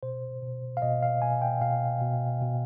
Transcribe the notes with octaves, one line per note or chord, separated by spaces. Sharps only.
B2 C5
B2
F5
B2 D#5
F5
B2 G#5
G5
B2 F5
B2
B2